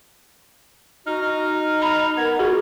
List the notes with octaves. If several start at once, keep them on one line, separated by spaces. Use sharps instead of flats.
D#4 F#4 F6
D#4
A#5 B5 F6
B3 A#4 G#6
F4 F#4 G#4